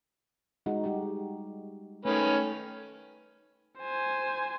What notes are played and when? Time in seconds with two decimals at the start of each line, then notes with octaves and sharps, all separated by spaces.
0.66 G#3 D#4 F#4
0.84 G3 D#4 G4
2.05 D#3 A3 C#4 A4 B4
3.79 C5 G#5